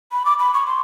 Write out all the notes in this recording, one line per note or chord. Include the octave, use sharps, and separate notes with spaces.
B5
D6
B5
C#6
C6